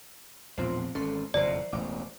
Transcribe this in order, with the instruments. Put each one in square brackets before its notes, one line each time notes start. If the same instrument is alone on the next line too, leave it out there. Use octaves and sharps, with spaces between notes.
[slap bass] A#1 E2 A2 [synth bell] C4 F4 C5
[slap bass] G#1 E3 C#4 [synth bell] A4 C6
[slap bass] F#1 F2 B2 [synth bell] E3 A#4 C5 [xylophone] D5
[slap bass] E1 A1 [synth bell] D6